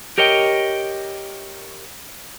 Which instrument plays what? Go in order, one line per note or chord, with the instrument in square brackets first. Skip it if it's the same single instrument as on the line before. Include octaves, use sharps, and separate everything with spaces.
[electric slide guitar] G4 A#4 C#5 D#5 G5